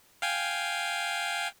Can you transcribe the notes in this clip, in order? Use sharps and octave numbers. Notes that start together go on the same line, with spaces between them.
F5 G5 G#5